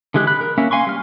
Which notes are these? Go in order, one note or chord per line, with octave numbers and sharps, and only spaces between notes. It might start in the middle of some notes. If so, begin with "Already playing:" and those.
D3 E3 G#3 G4 F#6
B5 F#6
A#4
A#3 C#4 E5
F5 G#5 C6 C#6
G3 F6